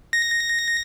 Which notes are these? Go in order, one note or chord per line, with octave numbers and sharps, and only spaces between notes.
A#6